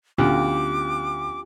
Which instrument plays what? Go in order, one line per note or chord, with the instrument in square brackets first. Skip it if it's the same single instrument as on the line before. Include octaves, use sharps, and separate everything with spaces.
[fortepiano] D2 [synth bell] B3 C#4 D4 [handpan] F4 G4 [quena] D6